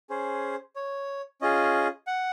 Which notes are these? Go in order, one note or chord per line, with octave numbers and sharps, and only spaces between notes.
C#4 G#4 C5
C#5
C#4 F4 G#4 D#5
F#5